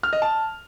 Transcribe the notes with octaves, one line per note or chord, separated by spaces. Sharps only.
F6
D#5
A5